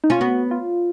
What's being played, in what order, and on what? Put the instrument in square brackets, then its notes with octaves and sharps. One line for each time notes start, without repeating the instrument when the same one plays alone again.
[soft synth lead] D#4
[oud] C#4 [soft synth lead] F4
[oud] B3 [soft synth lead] F#4
[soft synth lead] F4